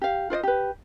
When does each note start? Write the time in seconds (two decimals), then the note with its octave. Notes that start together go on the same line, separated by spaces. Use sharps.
0.02 G4 F5
0.30 F4 C5 D5 D#5
0.43 G4 B4